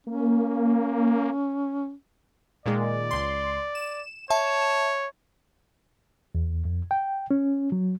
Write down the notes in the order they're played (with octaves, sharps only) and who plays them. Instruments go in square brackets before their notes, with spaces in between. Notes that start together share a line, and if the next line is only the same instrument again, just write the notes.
[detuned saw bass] A#3 [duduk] C#4
[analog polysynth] A#2 D#3 G#3 [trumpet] D5
[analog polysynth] C#2 C6
E7
[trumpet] C#5 [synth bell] E5 A5
[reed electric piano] E2
F2
G5
C#4
F#3